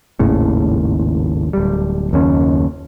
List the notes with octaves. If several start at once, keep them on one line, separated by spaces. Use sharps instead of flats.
G#1 D#2 A2 C#3
D1 G3
F#1 D#2 C#4